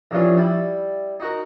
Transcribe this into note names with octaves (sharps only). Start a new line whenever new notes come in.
A#1 G2 E3 C#4 F4
G3 E4
D#4 F#4 A#4